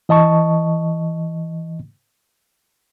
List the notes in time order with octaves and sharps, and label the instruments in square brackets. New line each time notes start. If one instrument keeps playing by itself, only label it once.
[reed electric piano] E3 D#5 A5 C#6